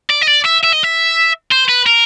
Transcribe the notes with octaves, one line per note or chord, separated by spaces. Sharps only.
D5
D#5
D5
E5
E5
D#5
E5
C5
B4
A#4